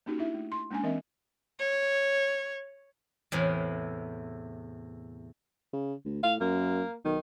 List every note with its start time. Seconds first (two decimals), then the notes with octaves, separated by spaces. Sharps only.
0.06 A#3 C#4 D#4 F#4 G4
0.18 D4 E4 E5
0.34 A3
0.52 C6
0.71 G#3 A#3 C#4 D4 G#5
0.83 E3 C4 A#4 D#5 E5
1.59 C#5
3.32 E2 A2 C3
5.74 C#3
6.05 D2
6.23 A2 F5
6.41 F#2 A#3
7.05 B1 D#3